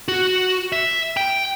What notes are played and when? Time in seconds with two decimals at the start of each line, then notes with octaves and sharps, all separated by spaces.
0.08 F#4
0.72 E5
1.17 G5